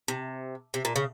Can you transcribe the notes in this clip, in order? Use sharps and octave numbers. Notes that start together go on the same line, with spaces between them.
C3
C3
A#2
C#3